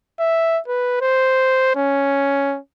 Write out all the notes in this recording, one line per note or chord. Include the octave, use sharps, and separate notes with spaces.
E5
B4
C5
C#4